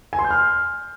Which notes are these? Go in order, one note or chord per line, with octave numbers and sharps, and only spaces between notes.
G#5
C6
G6
F6